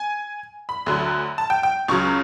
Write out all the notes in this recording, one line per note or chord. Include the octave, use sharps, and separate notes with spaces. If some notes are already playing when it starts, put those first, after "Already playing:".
Already playing: G#5
B5
D2 D3 F#3
A5
G5
G5
C#2 C#3 F#3 C#6